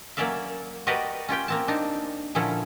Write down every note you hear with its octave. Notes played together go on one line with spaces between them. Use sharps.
F#3 A#3 C#4 D5 E5 F5
F#4 G4 A#4 B4 D5 D#5
C#4 F4 G4 G5
A#3 C4 A5
D4 D#4
A#2 D3 F3 C#4 E4 A4